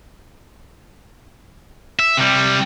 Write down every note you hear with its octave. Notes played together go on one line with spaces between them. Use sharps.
E5
C3 G3